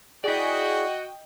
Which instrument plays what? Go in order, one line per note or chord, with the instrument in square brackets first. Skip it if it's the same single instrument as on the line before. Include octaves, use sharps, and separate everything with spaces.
[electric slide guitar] E4 D5 [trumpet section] F#4 [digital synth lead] G#4 [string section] D#5 G5